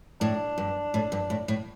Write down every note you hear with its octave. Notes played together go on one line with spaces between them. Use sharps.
A2 D4
G2
A2
G2
A2
A2